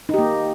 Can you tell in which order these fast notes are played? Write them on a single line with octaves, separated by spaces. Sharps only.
D#4 G4 A#3